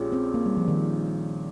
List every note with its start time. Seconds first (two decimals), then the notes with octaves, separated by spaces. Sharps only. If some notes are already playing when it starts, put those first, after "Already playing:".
Already playing: A#1 A#2 G#3 C#4 G4
0.12 C4
0.34 A#3
0.46 G3
0.57 F3
0.68 D#3